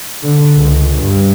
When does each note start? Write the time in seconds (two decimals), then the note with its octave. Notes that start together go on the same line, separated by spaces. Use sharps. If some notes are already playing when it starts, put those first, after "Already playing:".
0.23 D3
0.55 C#2
0.98 G2